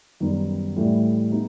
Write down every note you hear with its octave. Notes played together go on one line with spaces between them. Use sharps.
F#2 D#3 G3 B3
A2 E3 G3
G#3 B3 D#4